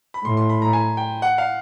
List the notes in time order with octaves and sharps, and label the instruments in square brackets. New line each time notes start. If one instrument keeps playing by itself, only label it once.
[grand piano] B5
[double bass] A2 [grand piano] C6
[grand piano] C6
B5
A#5
G#5
G5
F#5
F5